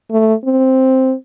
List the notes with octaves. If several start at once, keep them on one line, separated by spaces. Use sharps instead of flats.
A3
C4